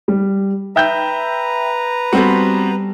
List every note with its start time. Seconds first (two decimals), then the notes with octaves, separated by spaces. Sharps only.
0.08 G3
0.76 B4 E5 G5 A#5 G6
2.13 G3 B3 C4 F#4 A4